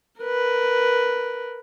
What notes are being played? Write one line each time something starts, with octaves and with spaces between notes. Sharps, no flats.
A#4 B4